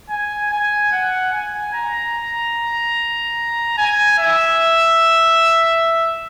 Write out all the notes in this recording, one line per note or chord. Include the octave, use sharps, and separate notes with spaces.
G#5
G#5
F#5
G#5
A#5
G#5
E5